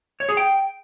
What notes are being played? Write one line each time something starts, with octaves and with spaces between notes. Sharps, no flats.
C#5
G#4
G5